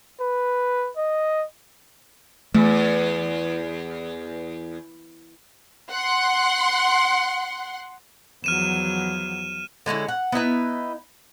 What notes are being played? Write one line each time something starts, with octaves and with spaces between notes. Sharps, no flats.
B4
D#5
E2 A3
F#5 C6
E2 F3 F#3 F6 D#7 E7
D3 G#3 C#4 E4
F#5
B3 D#4 E4 B4